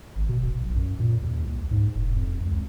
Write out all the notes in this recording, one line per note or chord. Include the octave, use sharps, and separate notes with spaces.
G#1
B2
D1
B1
F#2
A#2
D#2
C2
G#2
E1
F2
C#2